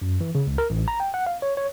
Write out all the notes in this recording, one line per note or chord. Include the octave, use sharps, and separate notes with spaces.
F#2
E3
C#3
C#2
A#4
A1
A#5
G5
F#5
F5
C#5
C#5